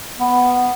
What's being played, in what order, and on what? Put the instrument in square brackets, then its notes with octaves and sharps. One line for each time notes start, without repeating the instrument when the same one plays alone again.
[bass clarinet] B3